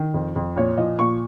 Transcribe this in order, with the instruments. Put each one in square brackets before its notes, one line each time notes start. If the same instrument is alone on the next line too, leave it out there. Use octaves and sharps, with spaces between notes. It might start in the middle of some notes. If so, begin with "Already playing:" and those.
Already playing: [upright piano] D#3
F2
F2
A#2 C#5
F3 D#5
A#2 C#6